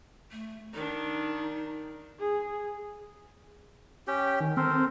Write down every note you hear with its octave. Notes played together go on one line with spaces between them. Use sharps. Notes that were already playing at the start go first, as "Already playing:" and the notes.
A3
D#3 D4 D#4
G#4
C#4 G4 G5
D#3
C4 A4 A#4 C5